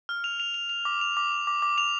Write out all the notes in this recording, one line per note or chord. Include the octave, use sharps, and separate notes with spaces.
F6
F7
F7
F7
F7
D6
F7
D6
F7
D6
D6
F7